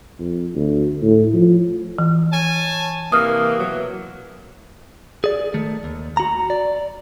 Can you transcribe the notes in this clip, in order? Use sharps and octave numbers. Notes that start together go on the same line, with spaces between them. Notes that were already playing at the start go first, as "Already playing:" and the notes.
F2
D2
A2
F3
E3
C#5 G#5 A5
C3 E3 A#3 D#6 F6
B2 E3 F#3
G#4 D5
D#3 A3
D#2
F#4 A#5
D5